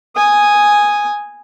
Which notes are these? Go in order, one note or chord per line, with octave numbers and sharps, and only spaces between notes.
G#5 D#6